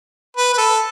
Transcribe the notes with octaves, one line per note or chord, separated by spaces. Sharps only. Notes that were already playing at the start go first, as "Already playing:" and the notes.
B4
B4
A4